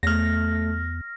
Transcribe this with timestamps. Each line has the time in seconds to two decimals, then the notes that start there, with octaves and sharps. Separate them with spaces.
0.03 E2 A3 F6 A#6